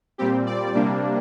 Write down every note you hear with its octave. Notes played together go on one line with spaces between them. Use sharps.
A#2 G3 C4 G4
D5
C3 G3 A#3 D4